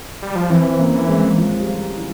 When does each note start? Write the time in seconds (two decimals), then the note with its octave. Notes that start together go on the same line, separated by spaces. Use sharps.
0.22 G3
0.35 F3
0.50 E3 C4 E4
0.70 C4
0.79 A#3 C#4
0.94 E3
1.09 G#3 C4
1.38 F3
1.60 G3
1.67 F3
1.97 E3